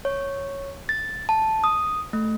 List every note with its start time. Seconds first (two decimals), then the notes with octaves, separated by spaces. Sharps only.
0.05 C#5
0.89 A6
1.29 A5
1.64 D#6
2.13 A3